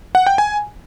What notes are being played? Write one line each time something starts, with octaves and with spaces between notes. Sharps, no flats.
F#5
G5
G#5